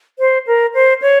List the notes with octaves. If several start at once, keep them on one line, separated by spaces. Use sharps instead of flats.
C5
A#4
C5
C#5